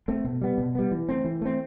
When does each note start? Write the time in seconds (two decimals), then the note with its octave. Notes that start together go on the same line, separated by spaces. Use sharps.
0.08 A3 C4
0.25 B2
0.41 G3 B3
0.58 B2
0.75 G3 B3
0.92 E3
1.09 A3 C4
1.25 E3
1.41 A3 C4